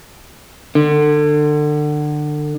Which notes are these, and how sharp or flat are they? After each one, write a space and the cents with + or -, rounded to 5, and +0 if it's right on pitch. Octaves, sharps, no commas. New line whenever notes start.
D3 +30